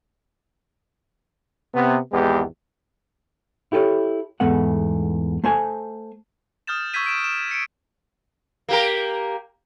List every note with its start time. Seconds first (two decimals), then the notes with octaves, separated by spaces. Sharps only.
1.75 C3 B3
2.12 G#1 E2 G#3 B3 G4
3.72 E4 G4 A4 B4 C#5
4.40 E2 G#2 A3 B3 F#5
5.44 A3 C5 G#5
6.67 D#6 F6 G6 A6 E7
6.94 C#6 E6 G6 G#6 B6 D#7
7.06 D7 E7
7.24 E7
7.51 C#7 D7
8.69 A#3 G4 A#4